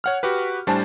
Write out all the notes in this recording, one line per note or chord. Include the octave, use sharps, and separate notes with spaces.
C#5 F#5 F6
F#4 G4 B4
A2 G3 D4 C5 G#5 A5